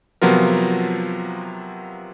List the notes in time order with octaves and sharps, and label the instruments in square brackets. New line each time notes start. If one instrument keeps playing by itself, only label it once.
[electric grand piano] C3 F3 F#3 B3 F4 A#4